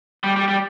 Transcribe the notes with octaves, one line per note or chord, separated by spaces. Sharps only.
G3
G3
G3